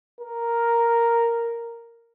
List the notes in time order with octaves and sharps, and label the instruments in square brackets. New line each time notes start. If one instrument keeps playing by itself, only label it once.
[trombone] A#4